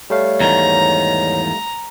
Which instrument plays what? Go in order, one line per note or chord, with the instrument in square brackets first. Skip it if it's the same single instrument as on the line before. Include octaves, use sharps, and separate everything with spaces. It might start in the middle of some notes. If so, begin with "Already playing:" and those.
[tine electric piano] G3 A3 F5 [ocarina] C#5
[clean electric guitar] E2 G#2 D#3 [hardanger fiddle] A#5